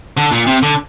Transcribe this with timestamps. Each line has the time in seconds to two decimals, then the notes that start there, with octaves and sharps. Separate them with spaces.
0.17 D3
0.32 A#2
0.47 C3
0.62 D3